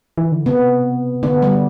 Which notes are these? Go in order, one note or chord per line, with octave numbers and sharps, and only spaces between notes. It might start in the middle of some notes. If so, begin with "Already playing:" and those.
E3
D3
C3 B3
D3 B3
G3